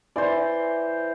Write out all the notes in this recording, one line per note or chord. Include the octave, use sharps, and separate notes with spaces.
E3 C5 D5